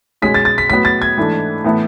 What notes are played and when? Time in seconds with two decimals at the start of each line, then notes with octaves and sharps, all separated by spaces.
0.22 B2 G#3 C#4 G#4 B6
0.34 A6
0.45 A6
0.58 B6
0.70 A2 F#3 B3 B6
0.85 A6
1.02 G#6
1.16 G#2 E3 A3 D4
1.64 A2 E3 B3 E4 A4